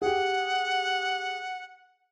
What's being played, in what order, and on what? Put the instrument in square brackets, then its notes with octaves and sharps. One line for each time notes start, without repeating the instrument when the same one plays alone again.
[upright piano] G4 G#4 [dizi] F#5